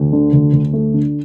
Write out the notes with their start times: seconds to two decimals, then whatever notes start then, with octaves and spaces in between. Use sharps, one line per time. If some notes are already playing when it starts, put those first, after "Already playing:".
Already playing: D2
0.13 D3
0.33 D2
0.53 D2
0.73 A3
0.94 D3